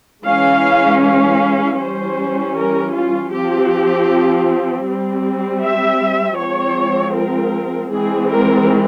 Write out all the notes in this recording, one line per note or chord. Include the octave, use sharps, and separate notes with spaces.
E3 G#3 C#4 F5
F5
E3 G3 C#4 C5
A#4
F4
F3 C4 G4
G3 C4
E5
F3 G#3 C4 C#5
A#4
E3 G#3 C4 G#4
A#4